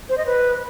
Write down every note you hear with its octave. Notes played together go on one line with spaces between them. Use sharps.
C5
D#5
B4